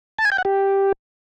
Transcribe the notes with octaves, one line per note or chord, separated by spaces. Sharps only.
A5
G#5
G5
F#5
G4